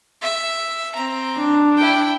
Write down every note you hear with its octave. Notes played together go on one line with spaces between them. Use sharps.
E5
C4 A#5
D4
E4 G5